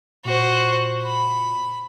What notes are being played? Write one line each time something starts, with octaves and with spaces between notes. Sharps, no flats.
A#2 F#4 C5
B5